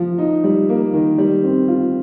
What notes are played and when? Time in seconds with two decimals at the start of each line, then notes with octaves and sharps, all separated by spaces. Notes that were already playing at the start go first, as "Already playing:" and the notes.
Already playing: F3
0.18 D#4
0.44 G3
0.69 A#3
0.94 D#3
1.18 G3
1.44 C4
1.68 F4